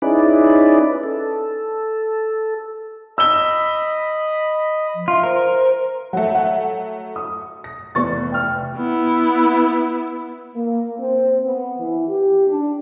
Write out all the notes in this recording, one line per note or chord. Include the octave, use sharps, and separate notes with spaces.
C#4 D#4 E4 G#4 B4 D5
A4
D#5 B5 E6 G7
F3
F4 E5
A#4 C5
F#3 A3 F#5
F#5
D#6
A#6
F1 E3 B3 D5 C#6 A6
G5 F6
B3 E4
A#3
C4
B3
E3
G4
D4